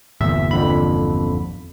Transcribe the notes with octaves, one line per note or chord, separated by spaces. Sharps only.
G1 E2 A#2 E5
F2 D3 B5